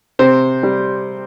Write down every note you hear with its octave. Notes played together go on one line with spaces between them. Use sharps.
C3 C5
G3